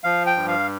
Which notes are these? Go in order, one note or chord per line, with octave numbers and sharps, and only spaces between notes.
F3 F5
G5
G2
F5